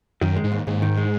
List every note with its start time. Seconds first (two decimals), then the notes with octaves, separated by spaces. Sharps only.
0.21 F#2 D#3
0.36 G#3
0.44 G#2
0.52 D#2
0.67 D#2 G#2
0.82 D#3
0.97 G#3